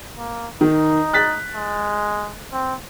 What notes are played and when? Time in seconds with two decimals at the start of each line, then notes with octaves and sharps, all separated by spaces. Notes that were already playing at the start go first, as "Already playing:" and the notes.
0.17 A#3
0.61 D#3 D#4
1.13 F#6 A6 B6
1.55 G#3
2.52 C4